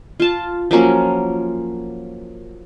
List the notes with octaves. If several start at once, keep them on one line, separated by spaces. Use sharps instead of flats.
F4 A5
F3 F#3 A#3 C#4